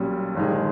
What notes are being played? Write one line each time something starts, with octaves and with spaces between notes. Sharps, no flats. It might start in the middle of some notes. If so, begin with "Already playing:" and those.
Already playing: B1 A#2 G3 C#4
G1 G2 D#3 G#3